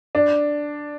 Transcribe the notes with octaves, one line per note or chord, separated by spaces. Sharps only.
D4